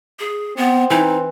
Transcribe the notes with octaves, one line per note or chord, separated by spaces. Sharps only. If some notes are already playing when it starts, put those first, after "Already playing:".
G#4
B3 C4
E3 D#4